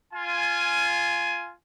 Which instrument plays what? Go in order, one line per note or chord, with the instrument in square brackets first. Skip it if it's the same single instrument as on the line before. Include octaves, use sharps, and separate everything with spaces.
[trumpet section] F4 G#5